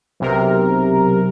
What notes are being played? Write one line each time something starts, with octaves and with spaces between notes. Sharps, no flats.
B1 C3 A#4